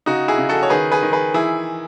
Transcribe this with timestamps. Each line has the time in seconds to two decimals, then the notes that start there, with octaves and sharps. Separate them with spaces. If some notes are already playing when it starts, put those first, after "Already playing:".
0.06 C#3 D#4 F#4
0.28 E4 G#4
0.38 C#3
0.49 F#4 A4
0.63 C#5
0.70 D#3 G#4 B4
0.92 G#4 B4
1.03 D#3
1.13 G#4 B4
1.34 E3 E4 G#4